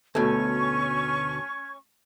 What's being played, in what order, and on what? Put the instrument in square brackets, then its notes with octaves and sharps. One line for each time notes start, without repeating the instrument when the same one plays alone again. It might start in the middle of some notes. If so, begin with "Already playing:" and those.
[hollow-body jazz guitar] D2 B2 [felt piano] A3 [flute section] C#4 C#6 [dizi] G#6